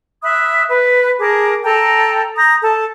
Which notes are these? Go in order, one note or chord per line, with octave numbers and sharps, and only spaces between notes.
E5 B5 D#6 F#6
B4
G#4 A#4 A5 D6
A4 G5 A5 A#5
A#5 D#6 G6
A4 A5